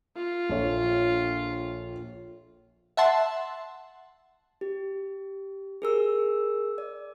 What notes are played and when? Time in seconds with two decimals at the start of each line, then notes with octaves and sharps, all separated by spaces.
0.17 F4
0.50 A#1 A4 C#5
2.97 E5 F#5 A5 C6
4.61 G4
5.82 G#4 A#4 E6
6.78 D5